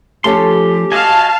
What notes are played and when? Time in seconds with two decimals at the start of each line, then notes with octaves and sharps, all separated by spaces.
0.24 F3 A3 C#4 G4 A4 C6
0.92 F#4 D#5 F5 G#5 A5